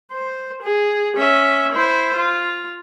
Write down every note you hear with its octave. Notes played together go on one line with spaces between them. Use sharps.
C5
G#4
C#4 E5
E4 C5
F4